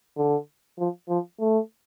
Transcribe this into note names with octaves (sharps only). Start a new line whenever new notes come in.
D3
F3
F3
A3